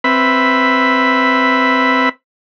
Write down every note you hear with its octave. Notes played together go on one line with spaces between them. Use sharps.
C4 B4 E5 B5